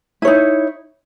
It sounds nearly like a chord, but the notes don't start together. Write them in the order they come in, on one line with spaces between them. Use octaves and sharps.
E4 C#5 D#4